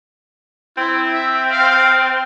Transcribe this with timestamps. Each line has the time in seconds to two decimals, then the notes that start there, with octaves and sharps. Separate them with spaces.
0.77 C4 E4
1.13 E5
1.51 F5